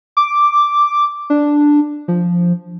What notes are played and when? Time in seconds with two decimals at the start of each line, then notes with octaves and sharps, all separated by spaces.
0.17 D6
1.30 D4
2.08 F3